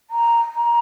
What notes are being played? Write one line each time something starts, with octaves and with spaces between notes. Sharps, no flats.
A#5
A#5